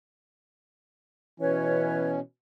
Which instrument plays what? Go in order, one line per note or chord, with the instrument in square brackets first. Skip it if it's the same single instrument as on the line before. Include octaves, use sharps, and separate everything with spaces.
[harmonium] B2 C#4 [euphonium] E3 [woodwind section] B4 C#5